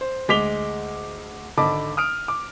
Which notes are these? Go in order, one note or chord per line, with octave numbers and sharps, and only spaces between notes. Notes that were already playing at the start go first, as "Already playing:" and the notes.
C5
D2 G#3 D6 B6 F7 G7
G#1 D3 D#5 A5 B5 D6
D#6 F6 D7
D6